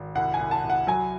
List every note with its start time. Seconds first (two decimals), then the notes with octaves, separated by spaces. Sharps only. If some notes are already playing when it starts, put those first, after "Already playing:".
Already playing: G#1
0.15 C2 F#5
0.34 G#5
0.39 C2
0.51 A5
0.64 C2
0.70 F#5
0.87 F#3 G#5